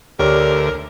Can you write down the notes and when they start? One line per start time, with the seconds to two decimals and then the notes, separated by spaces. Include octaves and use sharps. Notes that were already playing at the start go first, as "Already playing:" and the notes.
0.19 D2 G4 A#4 C#5 D5